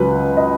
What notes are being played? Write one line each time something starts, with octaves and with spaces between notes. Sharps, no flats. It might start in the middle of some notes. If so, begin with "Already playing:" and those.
Already playing: C#2 C#3 F#3 B4
D#5